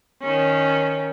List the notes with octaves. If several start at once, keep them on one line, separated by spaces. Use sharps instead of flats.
D#3 C#4